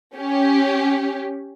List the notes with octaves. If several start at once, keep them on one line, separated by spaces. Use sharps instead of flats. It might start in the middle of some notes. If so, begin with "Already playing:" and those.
C#4 G4